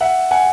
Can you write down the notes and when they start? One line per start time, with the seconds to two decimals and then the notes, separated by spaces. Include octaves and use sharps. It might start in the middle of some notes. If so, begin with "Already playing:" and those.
0.01 E5 F#5
0.31 F#5 G#5